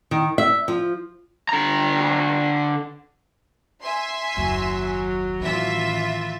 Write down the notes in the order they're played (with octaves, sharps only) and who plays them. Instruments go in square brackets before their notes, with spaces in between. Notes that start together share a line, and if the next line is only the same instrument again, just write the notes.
[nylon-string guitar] D#3
E5
F3
[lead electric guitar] D3 A#5
[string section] E5 G#5 C6
[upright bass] F#1 D#2 [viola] F#3
[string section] A1 E5 [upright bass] D#3 [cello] E3 F4